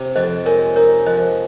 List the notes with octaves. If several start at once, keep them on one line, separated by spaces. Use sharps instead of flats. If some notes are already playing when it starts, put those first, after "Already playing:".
Already playing: C3
F2 C5 D#5
G#3 A#4 C#5
D#4 A#4 C#5
F3 C5 D#5